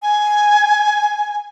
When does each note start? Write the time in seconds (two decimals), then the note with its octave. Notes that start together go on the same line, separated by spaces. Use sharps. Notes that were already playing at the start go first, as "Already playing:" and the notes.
0.02 G#5